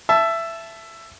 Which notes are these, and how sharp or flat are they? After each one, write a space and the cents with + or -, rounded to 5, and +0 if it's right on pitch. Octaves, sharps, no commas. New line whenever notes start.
E5 +15 A5 -10